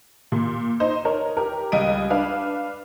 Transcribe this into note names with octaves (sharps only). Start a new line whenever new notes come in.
A#2
D#4 C5
D#4 A#4 C#5
G4 A#4
C#2 G3 D#5 D7 D#7
D4 B4 F5